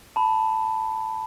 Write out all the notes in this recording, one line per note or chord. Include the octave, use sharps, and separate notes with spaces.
A5 B5